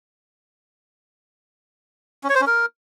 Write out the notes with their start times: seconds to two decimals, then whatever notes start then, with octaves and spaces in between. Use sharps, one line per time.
2.24 C#4
2.29 C#5
2.35 C5
2.41 C#4
2.47 A#4